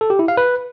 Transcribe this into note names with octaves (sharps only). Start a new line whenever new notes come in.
A4
G4
E4
F5
B4